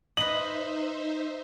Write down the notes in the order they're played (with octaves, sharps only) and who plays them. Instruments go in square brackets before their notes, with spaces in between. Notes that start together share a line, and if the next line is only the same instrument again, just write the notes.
[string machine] D#4 C5 E5 [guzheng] B4 D#5 [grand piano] F#7